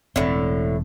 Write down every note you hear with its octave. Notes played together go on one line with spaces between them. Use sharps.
E1 A2 D3 C4